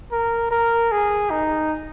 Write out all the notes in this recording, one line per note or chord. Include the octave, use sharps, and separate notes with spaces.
A#4
A#4
G#4
D#4